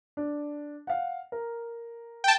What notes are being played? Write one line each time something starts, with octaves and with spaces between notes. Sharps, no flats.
D4
F5 F#5
A#4
G5 A5